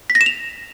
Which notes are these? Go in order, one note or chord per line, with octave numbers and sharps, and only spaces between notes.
B6
A#6
E7
F7